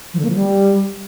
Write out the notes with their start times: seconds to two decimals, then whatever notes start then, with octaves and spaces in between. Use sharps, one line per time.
0.14 F3
0.19 D3
0.24 A#3
0.30 F3
0.35 G3